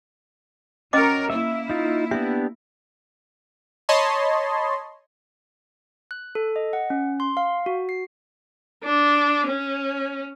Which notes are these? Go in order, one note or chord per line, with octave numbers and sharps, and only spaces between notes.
C#4 F#4 A#4 C#5 D#5 D6
A#3 E4 E5
D#4 F4
B3 D4 G4 E5
C#5 D#5 A5 B5 C6
F#6
A4
D#5
F#5
C#4
C6
F5
F#4
C7
D4
C#4